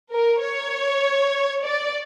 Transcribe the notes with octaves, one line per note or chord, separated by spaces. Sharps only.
A#4
C#5
D5